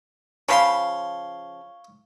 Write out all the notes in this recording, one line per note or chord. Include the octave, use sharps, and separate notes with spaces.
C#3 F3 C#5 F5 B5 C6